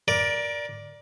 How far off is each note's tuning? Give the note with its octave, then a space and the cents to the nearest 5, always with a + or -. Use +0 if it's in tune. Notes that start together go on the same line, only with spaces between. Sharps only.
A#4 +25 D5 +0